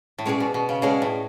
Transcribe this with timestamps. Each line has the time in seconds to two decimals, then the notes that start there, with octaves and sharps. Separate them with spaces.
0.18 A2
0.26 B2 G#3 C#4 G#4 D5
0.40 B2
0.54 B2
0.69 C#3
0.82 B2 G#3 C#4 G#4 D5
1.02 A2